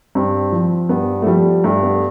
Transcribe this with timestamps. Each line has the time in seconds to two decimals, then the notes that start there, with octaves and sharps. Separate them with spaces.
0.15 G2 C4
0.52 F3
0.89 G2 B3
1.22 A3
1.26 F3 G3
1.64 G2 A3
1.83 B3